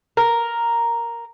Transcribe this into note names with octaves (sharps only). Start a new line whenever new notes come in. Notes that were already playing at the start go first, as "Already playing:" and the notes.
A#4